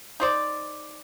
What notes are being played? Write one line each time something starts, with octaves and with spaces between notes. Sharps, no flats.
D#4 C5 D5